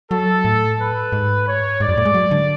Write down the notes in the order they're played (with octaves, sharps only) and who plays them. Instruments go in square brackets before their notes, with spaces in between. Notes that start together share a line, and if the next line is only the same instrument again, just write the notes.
[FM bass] F#3 [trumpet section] A4
[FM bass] A2
[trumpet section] B4
[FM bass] G#2
[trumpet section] C#5
[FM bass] G#2 [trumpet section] D5
[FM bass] F#2
A2
G#3
F#3
D3